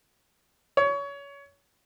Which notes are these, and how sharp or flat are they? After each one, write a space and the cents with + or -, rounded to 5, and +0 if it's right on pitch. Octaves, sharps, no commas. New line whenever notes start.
C#5 +25